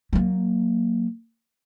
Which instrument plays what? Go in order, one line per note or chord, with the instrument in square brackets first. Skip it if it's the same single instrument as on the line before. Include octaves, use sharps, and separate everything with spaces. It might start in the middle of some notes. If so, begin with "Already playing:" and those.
[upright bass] F#3 A#3